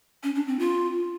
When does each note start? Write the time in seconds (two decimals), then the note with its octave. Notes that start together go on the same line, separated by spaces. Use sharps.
0.23 C#4
0.35 D4
0.47 C4
0.59 F4